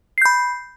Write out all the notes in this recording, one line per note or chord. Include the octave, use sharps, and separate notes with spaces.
B5 G6 C7